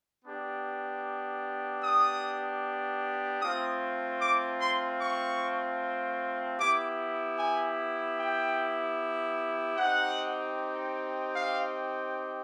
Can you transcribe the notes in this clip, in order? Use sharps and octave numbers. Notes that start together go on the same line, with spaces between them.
B3 D4 G4
D#6
A3 C4 F4 D#6
D6
C6
C#6
B3 E4 G4 D6
G#5
G5
C4 D#4 G4 F#5
F5